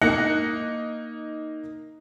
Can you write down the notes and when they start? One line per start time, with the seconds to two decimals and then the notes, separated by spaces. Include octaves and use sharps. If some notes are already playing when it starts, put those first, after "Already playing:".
0.02 A#3 D#4 F#6 A#6 C#7